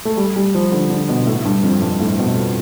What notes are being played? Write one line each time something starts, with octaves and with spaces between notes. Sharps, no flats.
A3
G3
G3
F3
D3
D3
B2
A2
G2
F2
G2
A2
B2